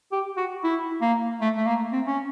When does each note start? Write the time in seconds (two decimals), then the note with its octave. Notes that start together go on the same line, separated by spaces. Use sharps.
0.12 G4
0.37 F#4
0.64 E4
1.01 A#3
1.41 A3
1.57 A3
1.66 A#3
1.92 C4
2.07 C#4